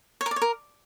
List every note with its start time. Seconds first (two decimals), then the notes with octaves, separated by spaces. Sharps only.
0.21 C#5
0.26 A#4
0.31 D5
0.36 C#5
0.42 A#4